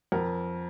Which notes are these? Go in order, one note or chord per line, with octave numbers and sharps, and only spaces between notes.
F2 A#4